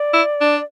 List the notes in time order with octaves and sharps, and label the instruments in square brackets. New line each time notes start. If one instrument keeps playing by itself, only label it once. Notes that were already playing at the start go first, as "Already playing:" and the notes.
Already playing: [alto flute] D5
[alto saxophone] E4
D4